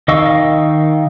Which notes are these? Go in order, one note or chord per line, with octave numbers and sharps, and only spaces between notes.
D#3 D#5 F5 C#6 E6